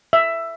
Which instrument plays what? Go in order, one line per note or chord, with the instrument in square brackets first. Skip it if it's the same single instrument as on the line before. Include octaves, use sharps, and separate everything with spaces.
[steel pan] E5